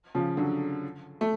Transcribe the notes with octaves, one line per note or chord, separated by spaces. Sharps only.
C#3 F3
D3 F#3
A3